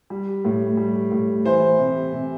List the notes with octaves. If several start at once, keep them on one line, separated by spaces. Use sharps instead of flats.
G3
A2
G3
A2
E3 C5
C3
C3